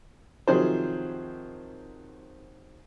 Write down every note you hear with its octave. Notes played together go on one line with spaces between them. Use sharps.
C3 D#3 F3 F#3 G#4 C5